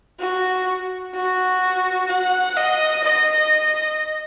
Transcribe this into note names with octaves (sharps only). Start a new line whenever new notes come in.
F#4
F#4
F#5
D#5
D#5